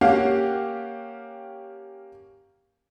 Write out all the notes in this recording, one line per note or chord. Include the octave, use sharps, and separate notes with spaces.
A#3 C#4 G4 F5 F#5